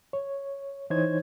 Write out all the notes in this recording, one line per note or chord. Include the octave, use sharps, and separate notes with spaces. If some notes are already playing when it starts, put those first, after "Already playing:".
C#5
E3 D#4 C5 C#5 G#6